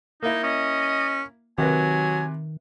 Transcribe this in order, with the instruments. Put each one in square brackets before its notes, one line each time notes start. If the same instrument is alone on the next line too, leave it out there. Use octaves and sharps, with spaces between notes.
[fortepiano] A#3 E4 [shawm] D#4
[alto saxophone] C#4 [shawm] D#5
[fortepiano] C3 B4 [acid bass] D#3 [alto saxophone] F#3 [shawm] G#5